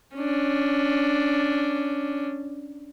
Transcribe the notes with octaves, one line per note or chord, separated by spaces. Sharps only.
C#4 D4